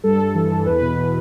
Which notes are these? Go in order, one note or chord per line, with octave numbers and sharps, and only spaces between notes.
G2 A4
G2
E3
E3
E2 B4
B2
B2